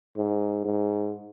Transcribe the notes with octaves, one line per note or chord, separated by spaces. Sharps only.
G#2
G#2